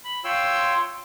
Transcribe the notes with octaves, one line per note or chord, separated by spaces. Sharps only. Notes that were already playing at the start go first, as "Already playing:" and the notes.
B5
F4 C#5 G5 C6 E6